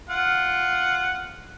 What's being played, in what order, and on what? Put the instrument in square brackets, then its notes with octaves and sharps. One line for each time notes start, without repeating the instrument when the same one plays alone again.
[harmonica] F4 F#5